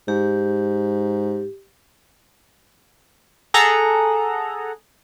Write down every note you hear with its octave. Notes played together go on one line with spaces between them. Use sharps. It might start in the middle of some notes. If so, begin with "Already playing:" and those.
G#2 G4
G#4 A4 F#5 A#5